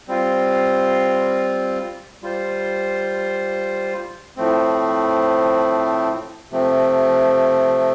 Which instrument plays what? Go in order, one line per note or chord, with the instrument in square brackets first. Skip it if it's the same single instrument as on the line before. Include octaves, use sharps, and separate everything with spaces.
[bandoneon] G3 C4 F4
G3 F4 C5
A2 F3 A3 C4
C3 F3 A3 C4